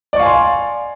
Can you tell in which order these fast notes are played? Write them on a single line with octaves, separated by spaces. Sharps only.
D5 C#6 F5 G#5 C6